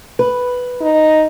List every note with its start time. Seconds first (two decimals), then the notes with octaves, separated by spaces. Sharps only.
0.19 B4
0.81 D#4